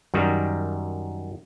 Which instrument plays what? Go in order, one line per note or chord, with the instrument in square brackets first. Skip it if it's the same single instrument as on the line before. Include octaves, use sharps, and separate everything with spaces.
[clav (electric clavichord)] F#2 D#3 G3